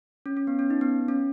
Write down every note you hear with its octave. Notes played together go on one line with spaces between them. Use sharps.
C#4
C#4
B3
C#4
D#4
B3
C#4